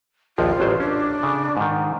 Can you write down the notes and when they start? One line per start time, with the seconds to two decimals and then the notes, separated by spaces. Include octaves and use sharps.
0.38 A#1 D#2 F3 F4
0.60 A1 F#3 C5
0.80 C#4 D4
1.23 C#3
1.57 G#2 D#3